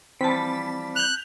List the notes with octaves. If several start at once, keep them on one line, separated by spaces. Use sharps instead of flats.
E3 F3 G3 C4 A5 B6
F#6 G6 F7